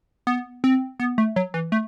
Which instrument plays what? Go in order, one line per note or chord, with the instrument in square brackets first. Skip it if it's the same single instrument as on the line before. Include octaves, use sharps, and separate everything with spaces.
[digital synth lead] B3
C4
B3
A3
F#3
E3
A3